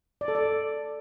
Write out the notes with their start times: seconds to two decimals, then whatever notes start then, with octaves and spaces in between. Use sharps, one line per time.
0.21 D5
0.28 A4
0.35 D5